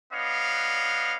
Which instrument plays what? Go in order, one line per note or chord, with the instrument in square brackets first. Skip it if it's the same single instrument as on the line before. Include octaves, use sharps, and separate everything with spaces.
[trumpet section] B3 D4 C#5 D#5 F5